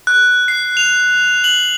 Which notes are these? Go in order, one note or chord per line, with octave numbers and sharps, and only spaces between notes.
F#6
C7
F7
F#7